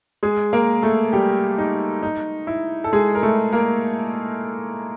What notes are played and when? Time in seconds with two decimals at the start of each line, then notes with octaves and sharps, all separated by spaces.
0.23 G#3 G#4
0.53 A#3 A#4
0.82 A3 A4
1.13 G3 G4
1.58 D#4
2.03 D#4
2.47 E4
2.84 A4
2.93 G#3 G#4
3.15 A#4
3.23 A3 A4
3.52 A#3 A#4